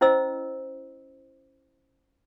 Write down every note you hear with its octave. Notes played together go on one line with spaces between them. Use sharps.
C#4 E4 C5 D#5 E6